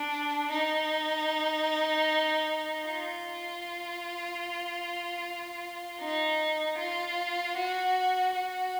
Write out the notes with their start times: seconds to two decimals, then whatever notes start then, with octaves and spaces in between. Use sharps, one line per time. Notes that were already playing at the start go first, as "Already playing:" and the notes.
Already playing: D4
0.51 D#4
2.86 F4
6.00 D#4
6.78 F4
7.56 F#4
8.35 F#4